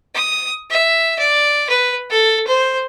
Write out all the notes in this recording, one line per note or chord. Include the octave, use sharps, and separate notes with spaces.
D#6
E5
D5
B4
A4
C5